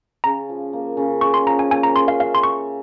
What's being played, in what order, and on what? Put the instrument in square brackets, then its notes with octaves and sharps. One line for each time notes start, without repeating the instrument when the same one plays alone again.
[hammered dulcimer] C#3 [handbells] A#5
[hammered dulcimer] F3
A#3
C#3
[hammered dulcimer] C#3 [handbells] C#6
[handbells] C6
[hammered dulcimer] F3 [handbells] A#5
[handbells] G#5
[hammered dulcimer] A#3 [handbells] G#5
[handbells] A#5
[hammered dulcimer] C#3 [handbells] C6
[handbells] F5
[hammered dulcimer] E5 [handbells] F5
[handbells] C6
[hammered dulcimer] G4 [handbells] C#6